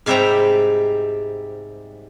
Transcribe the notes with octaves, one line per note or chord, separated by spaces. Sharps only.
G#2 C3 G3 E5 G5 A#5